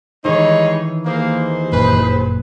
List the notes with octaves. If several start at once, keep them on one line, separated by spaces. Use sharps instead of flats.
D#3 E3 G3 G#3 D#4 C#5
D#2 A#3 G#4 C5
G1 F#2 A#2 B4